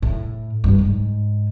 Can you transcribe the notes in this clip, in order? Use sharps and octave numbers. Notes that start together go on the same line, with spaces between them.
A2
G2
G#2